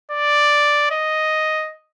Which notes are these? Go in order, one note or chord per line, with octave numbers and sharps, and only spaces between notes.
D5
D#5